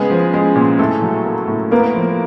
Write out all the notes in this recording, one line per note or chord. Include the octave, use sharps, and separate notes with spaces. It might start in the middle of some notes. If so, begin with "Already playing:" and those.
Already playing: C#3 G#3 B3 G#4
F3
G#3
A#2
A2 A3 A4
F#3
A#3
A2
A#3 B3 A#4
F3